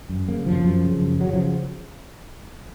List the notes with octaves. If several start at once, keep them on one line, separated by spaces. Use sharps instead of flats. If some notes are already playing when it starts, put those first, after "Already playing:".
F#2
C#3 A#3
F#2 F3
F#2
C#3
F#2
C#3 F#3
F3